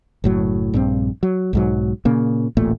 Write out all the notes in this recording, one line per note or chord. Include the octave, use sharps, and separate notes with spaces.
F#1 A2 F#3
A#1 G2 C4
F#3
B1 G#2 F#3
A#2 C#3 A#3
D1 A1 A#2 A3